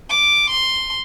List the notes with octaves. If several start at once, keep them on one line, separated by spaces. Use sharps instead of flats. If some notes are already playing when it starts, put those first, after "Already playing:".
D6
C6